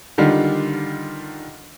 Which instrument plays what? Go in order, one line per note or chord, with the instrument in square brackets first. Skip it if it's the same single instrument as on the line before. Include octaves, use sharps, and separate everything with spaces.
[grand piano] D3 D#3 G3 D4 F4